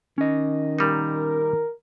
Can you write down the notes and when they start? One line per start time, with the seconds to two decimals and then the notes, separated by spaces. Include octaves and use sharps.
0.18 D#3 C#4 D#5
0.79 A#2 G3 D#4 A#4